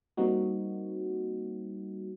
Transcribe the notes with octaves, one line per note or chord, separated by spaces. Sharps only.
G3 A#3 C4 D#4 F#4